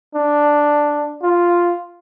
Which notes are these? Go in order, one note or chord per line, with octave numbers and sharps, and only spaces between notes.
D4
F4